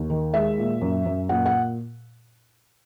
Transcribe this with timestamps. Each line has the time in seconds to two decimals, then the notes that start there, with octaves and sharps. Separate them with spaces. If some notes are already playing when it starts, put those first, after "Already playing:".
Already playing: D#2
0.10 D#3
0.34 G#3 E5
0.58 A#2
0.81 F#2
1.05 F#2
1.29 A#2 F#5
1.46 F#5